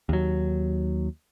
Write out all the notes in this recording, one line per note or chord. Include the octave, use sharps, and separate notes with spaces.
D#2 F#3